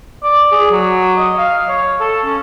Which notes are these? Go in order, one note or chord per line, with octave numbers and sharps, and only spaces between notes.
D5
G#4
F#3
D#5
F5
C#5
A4
C#4